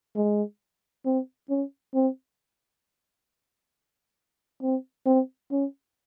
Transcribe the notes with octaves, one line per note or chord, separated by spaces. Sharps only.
G#3
C4
C#4
C4
C4
C4
C#4